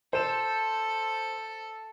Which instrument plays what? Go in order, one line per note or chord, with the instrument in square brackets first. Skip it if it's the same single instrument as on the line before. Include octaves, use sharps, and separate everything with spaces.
[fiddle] A4 [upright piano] C5 E7